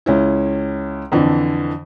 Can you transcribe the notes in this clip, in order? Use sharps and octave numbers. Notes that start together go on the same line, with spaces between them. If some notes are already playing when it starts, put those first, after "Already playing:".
C#2 C#4 E4
F2 D3 E3